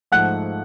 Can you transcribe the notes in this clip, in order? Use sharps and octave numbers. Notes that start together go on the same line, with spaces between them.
G#2 F3 A3 F#5 F#6